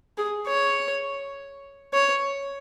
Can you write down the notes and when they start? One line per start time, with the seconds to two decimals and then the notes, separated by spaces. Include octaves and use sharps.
0.18 G#4
0.47 C#5
1.93 C#5